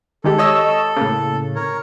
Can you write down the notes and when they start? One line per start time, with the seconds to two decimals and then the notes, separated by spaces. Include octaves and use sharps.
0.24 D#3 G#3 G4 A4
0.38 C#5 D#5 E6
0.97 A2 C#3 A#3
1.55 A#4 C#5